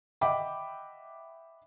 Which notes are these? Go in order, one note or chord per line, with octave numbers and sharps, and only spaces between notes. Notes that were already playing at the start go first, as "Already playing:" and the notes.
D#5 E5 F#5 G5 B5 D6